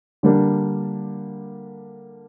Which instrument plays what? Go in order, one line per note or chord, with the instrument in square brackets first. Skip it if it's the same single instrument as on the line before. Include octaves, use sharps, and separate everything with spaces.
[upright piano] D3 G3 A#3 D4